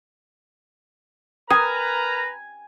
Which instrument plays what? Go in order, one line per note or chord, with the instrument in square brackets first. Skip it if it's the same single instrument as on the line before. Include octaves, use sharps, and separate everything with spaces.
[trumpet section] A#4 [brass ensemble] B4 A#5 [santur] G#5 [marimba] D#6